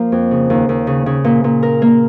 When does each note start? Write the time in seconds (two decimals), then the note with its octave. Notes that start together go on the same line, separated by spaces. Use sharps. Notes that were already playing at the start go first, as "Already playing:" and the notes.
Already playing: F3 A#3
0.12 F2
0.31 C#3
0.50 D#2
0.69 D#2
0.87 C#3
1.06 C#3
1.24 A#2
1.44 A#2
1.63 A#4
1.82 A#3